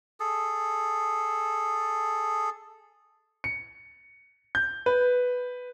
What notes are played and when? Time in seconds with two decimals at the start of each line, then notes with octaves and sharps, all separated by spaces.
0.20 G#4 A4
3.44 C#7
4.55 G6
4.86 B4